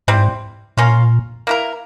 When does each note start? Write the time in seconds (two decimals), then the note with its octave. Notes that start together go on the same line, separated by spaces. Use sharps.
0.08 G#2 G3 C4 E4
0.77 A#2 A#3 C#4 F4
1.47 A#3 E4 A#4